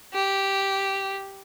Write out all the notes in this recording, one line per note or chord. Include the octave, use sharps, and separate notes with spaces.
G4